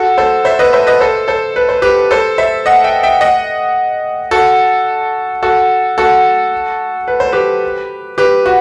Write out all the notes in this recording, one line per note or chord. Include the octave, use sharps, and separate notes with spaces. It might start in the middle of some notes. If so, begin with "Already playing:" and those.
Already playing: F#4 A4
A4 C5
C5 E5
B4 D#5
C5 E5
B4 D#5
A4 C5
A4 C5
B4
C5
G4 B4
A4 C5
C5 E5
D#5 F#5
E5 G5
E5 G5
D#5 F#5
F#4 A4
F#4 A4
F#4 A4
B4
C5
G4 B4
G4 B4
F#4